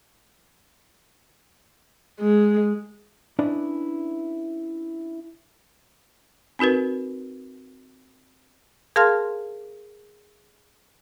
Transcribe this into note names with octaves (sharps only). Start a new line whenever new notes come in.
G#3
C#4 D4 E4 B4 D5 D#5
C4 D#4 F#4 A#4 B4
G#4 A#4 F5 A5 C6 F6